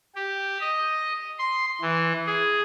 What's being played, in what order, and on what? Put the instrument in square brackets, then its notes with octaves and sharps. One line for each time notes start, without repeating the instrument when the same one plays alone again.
[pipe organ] G4
D#5
C6
E3
G#4